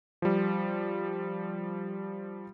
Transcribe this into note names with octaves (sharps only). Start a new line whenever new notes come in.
F3 G3